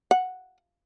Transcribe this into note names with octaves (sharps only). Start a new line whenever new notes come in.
F#5